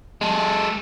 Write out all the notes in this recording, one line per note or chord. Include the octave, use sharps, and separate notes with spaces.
G#3 A4